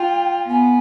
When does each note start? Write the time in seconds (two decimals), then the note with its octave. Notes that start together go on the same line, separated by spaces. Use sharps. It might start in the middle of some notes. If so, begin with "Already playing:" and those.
Already playing: F4 G5
0.48 B3 G#5